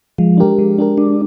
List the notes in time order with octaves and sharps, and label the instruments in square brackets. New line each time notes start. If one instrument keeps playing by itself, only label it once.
[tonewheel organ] F3 [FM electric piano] G#3
[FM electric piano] D4 G4 A#4
G#3
D4 G4 A#4
[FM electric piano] G#3 [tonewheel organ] D4